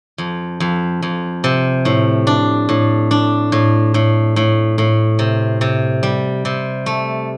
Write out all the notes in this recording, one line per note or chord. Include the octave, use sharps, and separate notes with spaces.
F2
F2
F2
C3
A2
D4
A2
D4
A2
A2
A2
A2
C3
C3
G3
C3
A3